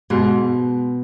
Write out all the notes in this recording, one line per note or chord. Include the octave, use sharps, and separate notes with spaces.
G#2 B2